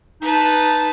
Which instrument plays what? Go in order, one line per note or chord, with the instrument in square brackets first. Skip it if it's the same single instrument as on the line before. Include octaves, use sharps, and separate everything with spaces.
[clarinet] D#4 [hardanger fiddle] B4 A5